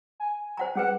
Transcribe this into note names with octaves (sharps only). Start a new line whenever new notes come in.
G#5
C5 F#5 A#5
G3 C#4 G#4 B4 F#5